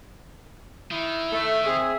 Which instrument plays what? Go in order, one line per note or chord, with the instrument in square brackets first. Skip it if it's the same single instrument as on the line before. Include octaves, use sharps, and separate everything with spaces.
[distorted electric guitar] D#3 [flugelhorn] E4
[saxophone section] A3 [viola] E5
[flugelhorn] C4 [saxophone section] G#4